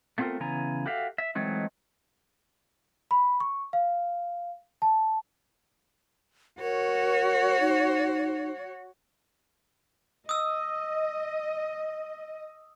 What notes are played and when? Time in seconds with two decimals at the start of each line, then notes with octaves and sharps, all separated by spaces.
0.18 A3 B3 C4 F4 A4 A#4
0.40 C#3 E3 B3 G#5 A#5
0.86 F#4 G4 A4 E5 F5
1.18 E5
1.35 E3 F#3 G#3 A3 C4 D#4
3.11 B5
3.40 C#6
3.73 F5
4.82 A5
6.61 F#4 A#4 C#5
7.60 D#4
10.29 D#5 D#6 E6